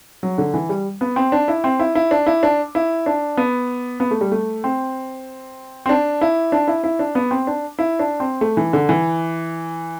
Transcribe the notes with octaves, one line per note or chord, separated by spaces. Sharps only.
F#3
D3
E3
G3
B3
C4
D4
E4
C4
E4
E4
D4
E4
D4
E4
D4
B3
B3
A3
G3
A3
C4
C4
D4
E4
D4
E4
E4
D4
B3
C4
D4
E4
D4
C4
A3
E3
D3
E3